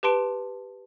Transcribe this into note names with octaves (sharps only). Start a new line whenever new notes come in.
G4 B4 A5 C6 D7